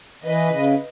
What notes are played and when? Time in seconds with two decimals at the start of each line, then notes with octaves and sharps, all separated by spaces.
0.25 E3 B4 D#5
0.50 C#3